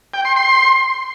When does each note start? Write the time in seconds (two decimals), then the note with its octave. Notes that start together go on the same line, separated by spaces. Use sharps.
0.14 G5
0.25 C6
0.36 C6